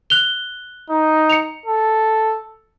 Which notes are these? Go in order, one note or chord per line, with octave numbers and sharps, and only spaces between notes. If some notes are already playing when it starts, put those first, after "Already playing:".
F#6 F7 G7
D#4
C#7 F7
A4